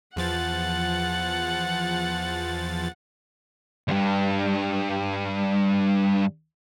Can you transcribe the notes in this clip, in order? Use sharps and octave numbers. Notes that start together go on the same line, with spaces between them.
E2 F3 F#5 A6
D2 G2